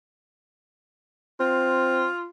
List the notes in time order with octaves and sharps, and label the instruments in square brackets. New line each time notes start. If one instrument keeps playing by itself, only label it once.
[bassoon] C4 [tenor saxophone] F4